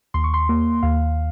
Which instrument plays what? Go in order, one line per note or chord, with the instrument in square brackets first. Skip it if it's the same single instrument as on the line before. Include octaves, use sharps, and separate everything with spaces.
[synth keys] D#2 C6
C#6
C6
A#3
D#2 F5